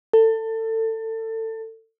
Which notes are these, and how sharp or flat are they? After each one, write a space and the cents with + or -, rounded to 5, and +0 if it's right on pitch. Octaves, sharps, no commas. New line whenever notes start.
A4 +25